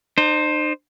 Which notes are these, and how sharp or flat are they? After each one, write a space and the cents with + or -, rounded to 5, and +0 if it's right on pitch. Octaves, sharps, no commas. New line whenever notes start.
D#4 -45 C5 +0